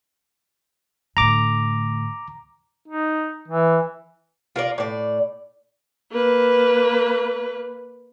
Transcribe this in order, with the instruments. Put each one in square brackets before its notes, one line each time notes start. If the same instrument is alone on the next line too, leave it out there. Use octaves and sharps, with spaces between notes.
[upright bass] A2 D3 [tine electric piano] A#5 D6
[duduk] D#4
E3
[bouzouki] F4 A#4 D5
A2 D5
[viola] A#3 B4